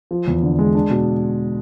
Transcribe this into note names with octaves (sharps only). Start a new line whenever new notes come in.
F3
E2
D3
G#3
D4
B2